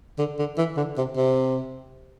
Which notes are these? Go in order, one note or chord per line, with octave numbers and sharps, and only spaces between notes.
D3
D3
E3
D3
C3
C3